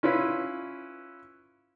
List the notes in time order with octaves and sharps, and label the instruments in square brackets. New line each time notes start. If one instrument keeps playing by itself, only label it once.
[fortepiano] C#4 E4 F4 B4